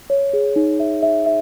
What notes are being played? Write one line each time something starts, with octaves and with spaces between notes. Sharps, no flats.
C#5
G#4
D#4
E5
E5
E5